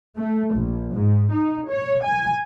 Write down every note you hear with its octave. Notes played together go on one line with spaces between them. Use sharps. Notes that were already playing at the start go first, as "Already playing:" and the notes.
A3
A#1
G#2
D#4
C#5
G#5